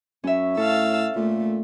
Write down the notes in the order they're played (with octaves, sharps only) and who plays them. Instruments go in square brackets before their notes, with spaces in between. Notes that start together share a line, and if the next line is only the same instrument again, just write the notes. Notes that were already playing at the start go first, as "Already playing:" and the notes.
[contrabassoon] F#2 [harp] C#4 E5
[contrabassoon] A2 [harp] A4 [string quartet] F5 A5 E6
[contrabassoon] A#2 [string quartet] A3